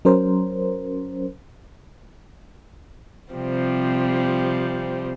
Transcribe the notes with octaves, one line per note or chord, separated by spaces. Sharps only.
F#3 C#4 A#4 C5
C3 F3 G3 C4